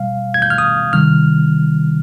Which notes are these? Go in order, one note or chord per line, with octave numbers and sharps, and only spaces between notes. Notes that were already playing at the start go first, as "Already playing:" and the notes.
Already playing: B2 G3 F5
G#6
G6
F6
D#6
C3 D#3 G3 F6